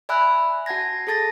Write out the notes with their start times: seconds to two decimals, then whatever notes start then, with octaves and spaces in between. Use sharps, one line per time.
0.09 D5 E5 G#5 B5 E6 F#6
0.66 F#4 F#5 A5 G#6 A#6
1.07 G#4 A4 A5 A6 A#6